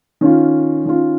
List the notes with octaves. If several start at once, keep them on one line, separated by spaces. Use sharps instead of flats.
D#3 C#4 F4
D#3 C#4 F4